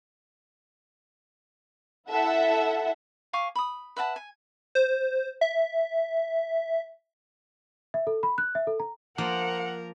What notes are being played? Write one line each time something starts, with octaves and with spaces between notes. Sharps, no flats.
E4 A4 E5 F#5
F5 G#5 C#6 D6
B5 D#6
B4 E5 F#5 A5
G#5
C5
E5
E5
A4
B5
F#6
E5
A4
A#5
F3 A#3 A#4 C5 F#5